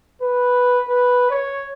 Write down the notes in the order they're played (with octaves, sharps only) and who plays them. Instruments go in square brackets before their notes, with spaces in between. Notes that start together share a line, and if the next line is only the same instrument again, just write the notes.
[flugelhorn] B4
B4
C#5